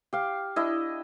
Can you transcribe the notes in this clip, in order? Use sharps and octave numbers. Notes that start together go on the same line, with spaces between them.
G4 F5
D4 E4 D#5